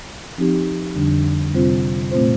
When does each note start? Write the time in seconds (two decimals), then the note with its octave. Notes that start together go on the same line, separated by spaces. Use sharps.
0.38 F3 C4 D#4 G4
0.95 F2 D3 G3 D4
1.53 C3 G3 C4 F4 C5
2.11 A#2 A3 C4 F4 C5